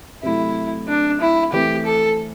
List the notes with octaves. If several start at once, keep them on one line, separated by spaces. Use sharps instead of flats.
C3 F#3 A3 E4
D4
E4
E3 A3 C4 G4
A4